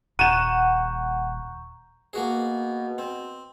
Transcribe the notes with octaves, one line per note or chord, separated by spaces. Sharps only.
D#1 F#5 A#5 C#6 G6 D#7 E7
B2 A#3 F#4 G#4
C4